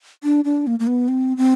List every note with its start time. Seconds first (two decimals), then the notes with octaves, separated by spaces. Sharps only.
0.24 D4
0.45 D4
0.67 A#3
0.79 A#3
0.87 B3
1.08 C4
1.37 C4